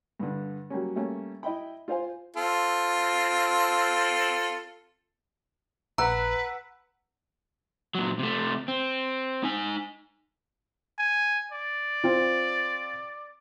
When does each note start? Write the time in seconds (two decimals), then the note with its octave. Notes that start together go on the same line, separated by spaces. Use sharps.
0.20 G2 D3
0.70 F#3 G3 A#3 C#4
0.96 G3 A3 A#3 C#4
1.43 E4 D#5 E5 G5 B5
1.88 F4 C5 F5 G#5
2.37 C4 F4 A4
5.98 A#1 B4 F#5 A#5 E6
7.95 A#2 F#3
8.19 C3 A3
8.68 C4
9.43 D#4 G#5
10.98 G#5
11.52 D5
12.04 C4 F4